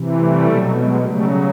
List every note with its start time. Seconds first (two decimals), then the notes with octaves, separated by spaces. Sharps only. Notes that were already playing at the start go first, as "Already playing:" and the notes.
Already playing: C3 E3
0.18 G3 A3
0.47 B2 F#3
0.76 F#3 G#3
1.05 C#3 F#3 G3 A3